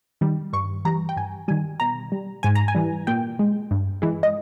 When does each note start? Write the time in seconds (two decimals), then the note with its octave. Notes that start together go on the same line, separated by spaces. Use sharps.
0.21 D#3 G3
0.53 G2 C#6
0.85 E3 G3 A#5
1.09 G5
1.16 G2 G#5
1.48 D#3 G3 G#5
1.80 B2 A#5
2.12 G3
2.43 G#2 G#5
2.55 A#5
2.68 G#5
2.75 E3 G3
3.07 A#2 G5
3.39 G#3
3.71 G2
4.02 E3 G#3
4.23 D#5